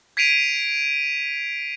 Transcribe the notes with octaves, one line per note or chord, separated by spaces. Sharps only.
G#6 B6 C7 D7 D#7 F7